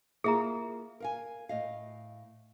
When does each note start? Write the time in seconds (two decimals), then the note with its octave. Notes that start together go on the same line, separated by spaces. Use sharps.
0.24 A#3 E4 F4 G#4 E5 A#5
1.00 A#4 F5 G#5
1.49 A2 D#5 F5